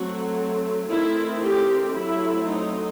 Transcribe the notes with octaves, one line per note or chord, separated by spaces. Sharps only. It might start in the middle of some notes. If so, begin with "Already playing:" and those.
Already playing: F#3 A3 C4 F#4
D#3 A3 C4 E4
G4
F#3 A3 C4 E4
D#4